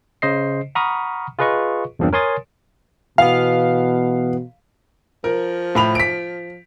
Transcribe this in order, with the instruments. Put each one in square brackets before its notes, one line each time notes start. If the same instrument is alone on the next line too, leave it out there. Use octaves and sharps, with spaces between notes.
[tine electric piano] C#3 C5 D#5 C7
F#5 A#5 B5 C#6 D#6 F6
F4 G#4 B4 D#5 C#6
E2 G2 F3 A#3 C4 D4
A#4 C#5 G#5 C6 D#6 A6
[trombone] B2 [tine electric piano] E3 B3 [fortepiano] F5
[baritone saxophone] F3 [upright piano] A#4
[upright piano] A2 B5 F7
B6 D7